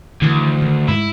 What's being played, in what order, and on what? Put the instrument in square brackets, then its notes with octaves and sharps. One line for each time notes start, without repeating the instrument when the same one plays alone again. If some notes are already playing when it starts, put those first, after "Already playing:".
[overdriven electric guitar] D2 [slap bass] D#3 E3
[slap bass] D#3
[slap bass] G#2 [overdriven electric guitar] E4